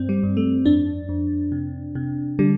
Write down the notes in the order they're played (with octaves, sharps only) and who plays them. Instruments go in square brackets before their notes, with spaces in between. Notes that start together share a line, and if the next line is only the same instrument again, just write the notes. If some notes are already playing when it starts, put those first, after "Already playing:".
Already playing: [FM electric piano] G2 C4
G3
G2
A3
F2 D4
F2
C3
C3
D3 G3